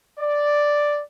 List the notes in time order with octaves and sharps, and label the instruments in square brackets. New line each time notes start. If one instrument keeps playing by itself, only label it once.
[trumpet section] D5